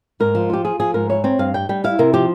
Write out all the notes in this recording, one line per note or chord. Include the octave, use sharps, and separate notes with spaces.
G#2 A#4
F3
F4 G4
F4 G#4
F3 G#4
G#2 A#4
E4 C#5
C4 C#5
G2 F5
G3 G5
G3 G5
E4 F5
C3 A#4
F3 G4